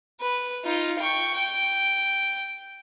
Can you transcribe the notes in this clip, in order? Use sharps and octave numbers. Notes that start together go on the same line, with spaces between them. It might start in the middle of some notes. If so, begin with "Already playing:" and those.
B4
D#4 F4
G5 C#6
G5